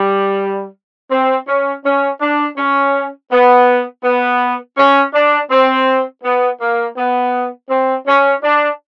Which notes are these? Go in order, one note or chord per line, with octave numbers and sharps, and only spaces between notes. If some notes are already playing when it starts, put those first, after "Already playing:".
Already playing: G3
C4
C#4
C#4
D4
C#4
B3
B3
C#4
D4
C4
B3
A#3
B3
C4
C#4
D4